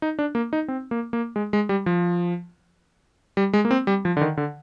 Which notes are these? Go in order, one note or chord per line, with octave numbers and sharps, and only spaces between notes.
D#4
D4
A#3
D#4
C4
A#3
A#3
G#3
G#3
G3
F3
G3
G#3
A#3
C4
G3
F3
D3
D#3
D3